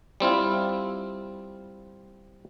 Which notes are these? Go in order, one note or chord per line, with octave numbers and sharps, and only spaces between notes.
G3 C4 E4 F4